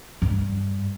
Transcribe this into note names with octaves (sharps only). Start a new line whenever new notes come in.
G2